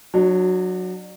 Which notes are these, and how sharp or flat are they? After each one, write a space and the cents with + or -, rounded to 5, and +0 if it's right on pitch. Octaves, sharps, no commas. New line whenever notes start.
F#3 -10 D4 +35